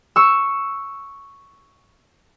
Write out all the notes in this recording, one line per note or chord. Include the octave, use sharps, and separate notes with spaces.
C#6 E6